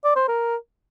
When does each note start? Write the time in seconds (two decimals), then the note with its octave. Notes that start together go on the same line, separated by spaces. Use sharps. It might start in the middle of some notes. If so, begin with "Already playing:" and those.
0.04 D5
0.16 C5
0.28 A#4